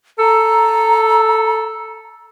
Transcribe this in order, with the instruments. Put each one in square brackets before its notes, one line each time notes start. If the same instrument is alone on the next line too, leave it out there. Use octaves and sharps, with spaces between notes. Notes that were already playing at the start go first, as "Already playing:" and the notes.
[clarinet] A4 [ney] A#5